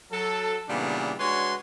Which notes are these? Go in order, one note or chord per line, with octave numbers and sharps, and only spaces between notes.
F#3 A4
A#2 C#3 E3 G3 B3 D4
G#3 D4 F#4 B4 C#5 C6